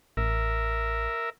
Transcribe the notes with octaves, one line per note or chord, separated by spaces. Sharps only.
A1 A#4 E5